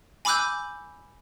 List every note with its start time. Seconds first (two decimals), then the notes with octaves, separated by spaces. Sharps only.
0.25 G#5 B5 D6 E6 F#6 G6